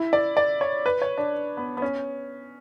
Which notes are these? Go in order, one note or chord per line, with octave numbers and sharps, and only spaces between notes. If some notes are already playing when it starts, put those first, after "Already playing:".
Already playing: E4
D5
D5
C#5
B4
C#5
D4
B3
B3
C#4